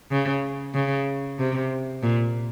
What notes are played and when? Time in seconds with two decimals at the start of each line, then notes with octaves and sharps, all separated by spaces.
0.11 C#3
0.74 C#3
1.39 C3
2.03 A#2